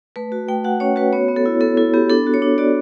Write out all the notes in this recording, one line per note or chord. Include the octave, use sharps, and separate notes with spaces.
A3 B4
F#4
A3 G5
F#4 F#5
C#4 C#5
F#4 B4
B3 C#5
B3
A4
E4
B3 A4
E4 A4
B3 G4
D4 A4
F#4
C#5
D4
F#4 D5